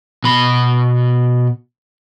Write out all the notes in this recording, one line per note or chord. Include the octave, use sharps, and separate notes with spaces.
B2 B5